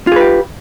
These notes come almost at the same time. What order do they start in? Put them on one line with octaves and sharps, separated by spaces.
F4 G#4 B4 G4